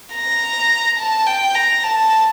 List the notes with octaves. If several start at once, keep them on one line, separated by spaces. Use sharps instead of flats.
A#5
A5
G5
A#5
A5